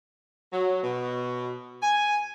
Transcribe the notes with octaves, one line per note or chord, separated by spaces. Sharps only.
F#3
B2
G#5